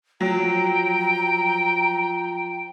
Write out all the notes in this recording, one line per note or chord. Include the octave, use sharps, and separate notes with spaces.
F3 F#3 G5 A#5